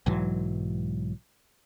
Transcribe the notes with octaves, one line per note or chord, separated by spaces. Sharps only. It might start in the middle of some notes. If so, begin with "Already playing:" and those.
B1 G#2 E3 F#3